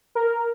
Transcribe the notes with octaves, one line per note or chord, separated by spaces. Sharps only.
A#4